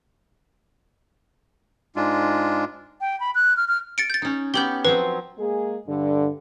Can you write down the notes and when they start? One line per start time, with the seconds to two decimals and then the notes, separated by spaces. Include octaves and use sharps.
1.96 G#2 G#3 D4 F4
3.01 G5
3.20 B5
3.35 F#6
3.57 F6
3.68 F6
3.98 A6 C#7 D7
4.10 G6 A6
4.22 C#4 D#4
4.54 B3 C#4 G4 G6 F#7 G7
4.85 F3 F#3 C4 B4
5.39 G#3 A#3 G#4
5.88 G2 D3